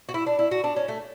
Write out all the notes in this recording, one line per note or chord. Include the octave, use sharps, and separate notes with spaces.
F#4
E4
D4
E4
F#4
D4
C#4
A3